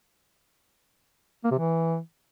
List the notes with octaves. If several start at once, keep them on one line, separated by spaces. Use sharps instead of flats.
A#3
C3
E3